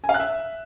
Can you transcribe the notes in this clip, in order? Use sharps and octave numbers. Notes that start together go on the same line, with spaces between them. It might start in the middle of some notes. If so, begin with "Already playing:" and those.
G#5
F5
F#6
E5